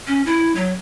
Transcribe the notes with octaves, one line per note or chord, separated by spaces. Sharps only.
C#4
E4
F#3